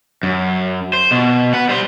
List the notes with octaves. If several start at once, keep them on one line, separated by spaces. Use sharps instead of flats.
F#2
C5
B2
B4 F#5
G3 C5